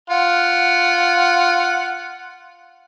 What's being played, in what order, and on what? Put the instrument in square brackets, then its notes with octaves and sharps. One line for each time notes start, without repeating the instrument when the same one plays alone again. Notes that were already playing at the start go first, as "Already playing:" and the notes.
[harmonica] F4 F#5